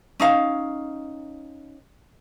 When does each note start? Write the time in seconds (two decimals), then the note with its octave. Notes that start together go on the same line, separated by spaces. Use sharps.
0.20 C#4 D#4 F5